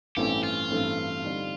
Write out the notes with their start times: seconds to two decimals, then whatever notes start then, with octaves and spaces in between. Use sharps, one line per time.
0.17 A1 G2 E3 A3 C4 G4
0.43 F4
0.71 A1 G2 E3 A3 C4
1.24 D3 G3 C4 D#4